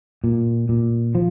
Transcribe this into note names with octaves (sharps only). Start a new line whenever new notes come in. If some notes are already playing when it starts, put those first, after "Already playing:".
A#2
A#2
F3